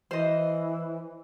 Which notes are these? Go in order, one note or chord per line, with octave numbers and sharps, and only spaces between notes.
E3 C5 D#5